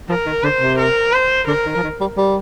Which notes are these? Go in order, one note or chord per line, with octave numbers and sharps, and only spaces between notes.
F3 A#4
D#3
D3 C5
C3
A#4
C5
D3 A#4
D#3
F3
D#3
G3
G3